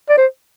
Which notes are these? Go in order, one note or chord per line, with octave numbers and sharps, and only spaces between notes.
D5
C5